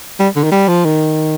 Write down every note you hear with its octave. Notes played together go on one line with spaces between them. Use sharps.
G3
D3
D#3
G3
F3
D#3